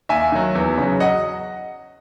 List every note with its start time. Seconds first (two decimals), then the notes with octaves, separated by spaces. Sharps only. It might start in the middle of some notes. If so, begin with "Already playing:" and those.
0.09 D#2 E5 G#5
0.32 D#3 F#3
0.55 E2
0.78 C#3 F#3
1.00 D#5 F#5